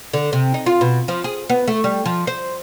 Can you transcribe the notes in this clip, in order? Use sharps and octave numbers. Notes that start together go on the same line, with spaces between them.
D3
C3
D#4
F4
B2
F3
G#4
B3
A3
G3
F3
C5